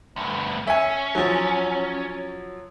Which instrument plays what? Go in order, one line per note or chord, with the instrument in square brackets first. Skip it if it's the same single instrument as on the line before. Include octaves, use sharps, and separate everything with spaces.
[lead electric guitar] D2 G2
[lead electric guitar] C#4 [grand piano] E5 G#5
[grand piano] F3 F#3